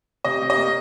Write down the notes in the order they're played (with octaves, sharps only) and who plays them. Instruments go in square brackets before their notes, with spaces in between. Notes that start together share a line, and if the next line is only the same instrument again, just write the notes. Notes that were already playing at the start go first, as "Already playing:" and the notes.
[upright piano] C3 D#5
C3
D#5
A#3